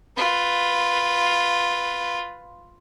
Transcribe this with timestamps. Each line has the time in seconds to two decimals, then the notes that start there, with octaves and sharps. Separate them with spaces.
0.17 F4 B4